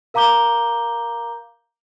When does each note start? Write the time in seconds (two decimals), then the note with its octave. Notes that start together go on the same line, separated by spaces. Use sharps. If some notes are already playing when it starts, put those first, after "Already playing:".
0.14 A#4 F5 A#5 D6 G6 G7